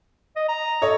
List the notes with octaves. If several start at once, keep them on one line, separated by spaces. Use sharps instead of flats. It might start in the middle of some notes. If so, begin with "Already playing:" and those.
D#5
A#5
A4 C#5 D#5